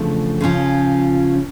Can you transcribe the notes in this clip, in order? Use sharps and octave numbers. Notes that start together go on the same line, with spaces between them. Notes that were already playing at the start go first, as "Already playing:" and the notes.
Already playing: E2 C#3 F3 A3 D4
C#3 F3 C#4 F4